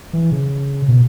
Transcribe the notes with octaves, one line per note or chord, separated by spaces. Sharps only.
E3
C#3
B2